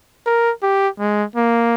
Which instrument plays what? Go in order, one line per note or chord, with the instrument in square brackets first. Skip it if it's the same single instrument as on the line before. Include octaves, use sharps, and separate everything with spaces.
[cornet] A#4
G4
G#3
A#3